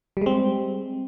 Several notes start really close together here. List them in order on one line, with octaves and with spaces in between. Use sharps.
G3 G#3 C4